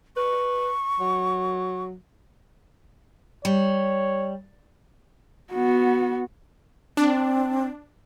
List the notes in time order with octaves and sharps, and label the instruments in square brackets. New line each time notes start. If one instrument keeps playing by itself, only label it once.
[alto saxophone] B4 [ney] C#6
[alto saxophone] F#3
[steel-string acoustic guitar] G3 [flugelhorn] C#5
[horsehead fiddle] B3 F#4
[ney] C4 [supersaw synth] D4